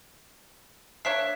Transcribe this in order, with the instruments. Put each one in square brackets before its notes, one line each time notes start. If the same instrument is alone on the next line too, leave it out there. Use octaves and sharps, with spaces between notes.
[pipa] A#3 D4 C#5 [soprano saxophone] E5 [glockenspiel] F#6 C7